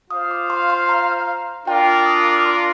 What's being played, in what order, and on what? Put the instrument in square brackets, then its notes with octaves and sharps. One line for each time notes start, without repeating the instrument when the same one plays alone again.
[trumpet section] F4 C5 F5 [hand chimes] D#6
[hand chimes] D6
C6
C6
A#5
[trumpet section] D4 F4 A#4 D5 [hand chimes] G5
[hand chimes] D#6
D6
C6